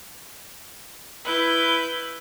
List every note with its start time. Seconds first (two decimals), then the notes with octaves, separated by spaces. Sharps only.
1.23 E4 B4 G6